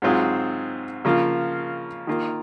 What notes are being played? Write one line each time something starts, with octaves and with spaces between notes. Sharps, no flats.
G#2 F#3 C4 F4 G#4
C#3 F3 A#3 F4
D#3 A#3 F4